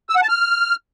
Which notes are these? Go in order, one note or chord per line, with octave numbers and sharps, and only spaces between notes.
E6
F#5
A5
F6